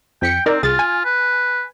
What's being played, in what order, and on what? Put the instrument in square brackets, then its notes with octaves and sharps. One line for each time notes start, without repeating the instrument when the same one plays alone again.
[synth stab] F2 B6 C#7 [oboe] G5
[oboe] C4 [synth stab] D#4 A#4 D5
[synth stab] C2 G#4 A6 [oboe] F4
[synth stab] G#5
[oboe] B4